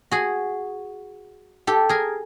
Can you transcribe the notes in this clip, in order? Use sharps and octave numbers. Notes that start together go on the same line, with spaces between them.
F#4 G#4
G4 A4
G#4 A#4